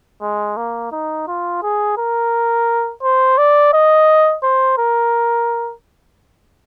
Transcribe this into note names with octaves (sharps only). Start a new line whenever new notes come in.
G#3
A#3
D#4
F4
G#4
A#4
C5
D5
D#5
C5
A#4